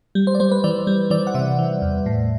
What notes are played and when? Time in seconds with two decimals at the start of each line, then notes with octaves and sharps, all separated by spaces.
0.15 G3
0.27 C5
0.35 D5
0.40 G3 C5
0.51 B4
0.64 E3 D5
0.87 G3
1.10 E3 D5
1.27 F#5
1.34 C3 E5
1.59 E3
1.82 E2
2.06 A2